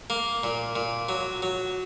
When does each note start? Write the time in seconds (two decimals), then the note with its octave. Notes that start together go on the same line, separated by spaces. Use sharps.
0.10 A#3
0.44 A#2
0.76 A#2
1.09 F#3
1.42 F#3